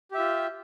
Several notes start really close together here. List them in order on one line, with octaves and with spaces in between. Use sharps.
G4 E5 F4